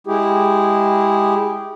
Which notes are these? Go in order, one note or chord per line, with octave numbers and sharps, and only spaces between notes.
G#3 E4 G4 G#4